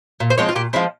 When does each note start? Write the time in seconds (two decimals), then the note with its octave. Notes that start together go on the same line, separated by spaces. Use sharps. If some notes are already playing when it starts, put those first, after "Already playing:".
0.20 A#2
0.30 C5
0.38 F3 G#3 C4 C#5
0.49 F4
0.55 A#2 G4
0.73 F3 G#3 C4 E4